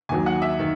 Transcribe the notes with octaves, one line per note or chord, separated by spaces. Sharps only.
D#2 D#3 F#3 G#5
F#5
E5
D#3